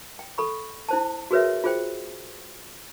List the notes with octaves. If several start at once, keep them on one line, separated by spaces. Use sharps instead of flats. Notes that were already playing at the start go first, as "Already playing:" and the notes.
G5
A4 B5 C#6
E4 C5 A5
F#4 G#4 A#4 B4 C#5 E5
F4 G#4 C5 G5